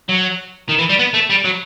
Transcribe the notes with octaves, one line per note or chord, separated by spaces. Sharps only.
F#3
D#3
E3
G3
B3
A3
G3
F#3